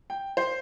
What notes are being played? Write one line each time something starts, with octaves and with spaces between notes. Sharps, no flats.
G5
C5